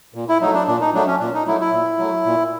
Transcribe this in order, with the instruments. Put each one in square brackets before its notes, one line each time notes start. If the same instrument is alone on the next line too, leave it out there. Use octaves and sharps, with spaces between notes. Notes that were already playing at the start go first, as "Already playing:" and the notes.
[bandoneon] A#2
E4
F#3 A3 D#4
D4
A#2 D4
D#4
F#3 A3 D4
C#4
A#2 D4
D#4
F#3 A3 E4
E4
A#2
F#3 A3
A#2